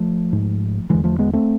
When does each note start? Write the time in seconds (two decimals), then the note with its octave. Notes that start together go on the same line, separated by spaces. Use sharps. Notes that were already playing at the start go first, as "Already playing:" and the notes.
Already playing: F3 A3
0.33 G#2
0.90 E2 D3 E3 G#3
1.04 F3 A3
1.19 G#3 B3
1.33 A3 C4